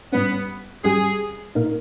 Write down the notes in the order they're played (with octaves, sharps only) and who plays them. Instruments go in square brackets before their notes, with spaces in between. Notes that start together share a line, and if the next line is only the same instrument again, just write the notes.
[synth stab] G#2 G3 C#4 [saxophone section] B3
[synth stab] G#2 G3 C#4 G4 [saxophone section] G#4
[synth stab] A#2 A#3 D#4 A#4